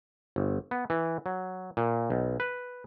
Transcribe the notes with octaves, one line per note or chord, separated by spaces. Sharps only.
G1
B3
E3
F#3
A#2
B1
B4